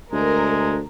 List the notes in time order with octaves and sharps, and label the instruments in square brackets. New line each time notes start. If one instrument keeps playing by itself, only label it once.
[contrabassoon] D2 [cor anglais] G#3 [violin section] A#4